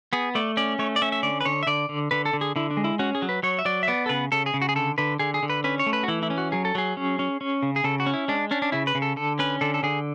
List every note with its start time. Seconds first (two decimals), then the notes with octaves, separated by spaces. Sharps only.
0.13 B3 G#4
0.35 A3 D5
0.57 C#4 D5
0.79 A3 C#5
0.96 D5
1.02 C#4 E5
1.12 E5
1.23 D3 D5
1.41 B4
1.45 D3 C#5
1.63 E5
1.67 D3 D5
1.89 D3
2.11 D3 B4
2.26 A4
2.33 D3
2.41 G#4
2.56 D3 E4
2.71 D4
2.77 G#3
2.84 E4
2.99 C#4 F#4
3.15 G#4
3.22 F#3
3.29 B4
3.43 F#3 C#5
3.59 E5
3.65 F#3 D5
3.83 E5
3.88 B3 D5
4.06 A4
4.09 C#3 B4
4.32 C#3 A4
4.46 G#4
4.54 C#3
4.62 F#4
4.69 G#4
4.76 D3 A4
4.98 D3 B4
5.19 D3 G#4
5.34 G#4
5.43 D3
5.50 B4
5.64 C#4 B4
5.79 C#5
5.86 A3
5.93 B4
6.03 F#4
6.08 E3 E4
6.23 E4
6.30 C#4
6.38 F#4
6.52 F#3 G#4
6.65 A4
6.75 F#3 G#4
6.97 C#4
7.19 C#4
7.41 C#4
7.63 C#3
7.76 G#4
7.84 C#3 A4
8.00 F#4
8.06 C#4
8.14 E4
8.28 G#3 D4
8.51 C#4 D4
8.62 D4
8.72 C#3 E4
8.87 B4
8.95 C#3
9.02 A4
9.16 D3 A4
9.39 C#4 B4
9.61 D3 A4
9.74 A4
9.83 D3 G#4